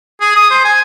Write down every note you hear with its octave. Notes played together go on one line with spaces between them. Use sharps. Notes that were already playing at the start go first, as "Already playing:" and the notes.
G#4
D#6
C5
G#5